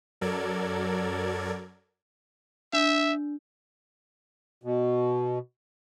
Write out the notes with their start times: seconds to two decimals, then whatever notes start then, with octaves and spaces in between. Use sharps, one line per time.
0.21 F#2 F#3 A4 A#4 D5 G#6
2.73 D4 E5
4.63 B2